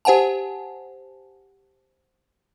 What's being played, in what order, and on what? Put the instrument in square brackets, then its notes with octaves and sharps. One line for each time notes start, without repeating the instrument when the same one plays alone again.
[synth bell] G4 C5 F#5 G#5 A5